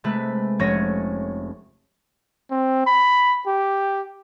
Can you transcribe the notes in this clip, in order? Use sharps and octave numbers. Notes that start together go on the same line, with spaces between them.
C3 G#3 A3 B4
F1 C#4 C#5 A#6
C4
B5
G4